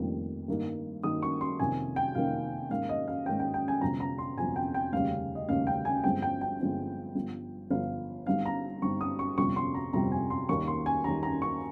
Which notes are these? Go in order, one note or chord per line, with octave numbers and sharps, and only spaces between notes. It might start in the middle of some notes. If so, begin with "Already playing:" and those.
Already playing: F1 F2 D#3 G3 A#3
G2 D#3 A#3 D#4
G2 D#3 A#3 D#4 D#6
C#6
C6
F2 C3 D#3 A#3 C#4 G#5
G5
F2 C3 D#3 A#3 C#4 F5
G#2 D#3 A#3 C#4 F5
D#5
F5
G#2 D#3 A#3 C#4 G5
G5
G5
G#5
G1 F2 C3 A#5
A#5
C6
G1 F2 C3 G#5
G5
G5
F1 D#2 C#3 G3 C#4 F5
D#5
F1 D#2 C#3 G3 C#4 F5
G5
G#5
G1 G2 F3 G#3 C4 G5
G5
G5
G1 G2 F3 G#3 C4
G1 G2 F3
G1 G2 F3 F5
G1 G2 G3 C4 D#4 F5
A#5
G1 G2 G3 C4 D#4 C#6
D#6
C#6
G1 F2 C3 G3 C4 C#6
C6
A#5
G1 F2 C3 G3 C4 A#5
G#5
C6
D#2 D#3 G3 A#3 C#4 C#6
C6
G#5
D#2 D#3 G3 A#3 C#4 A#5
A#5
C#6